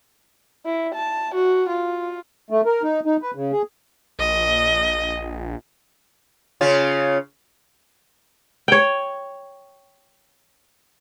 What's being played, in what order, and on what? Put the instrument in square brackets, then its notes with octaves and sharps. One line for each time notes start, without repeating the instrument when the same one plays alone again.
[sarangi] E4
A5
F#4
F4
[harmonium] A3
A#4
D#4
D#4
B4
C#3
G#4
[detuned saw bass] A#1 [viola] D#5
[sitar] C#3 C#4 F4
[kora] C#5 G5